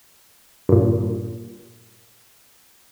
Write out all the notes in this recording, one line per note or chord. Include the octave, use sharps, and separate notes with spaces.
G2 A#2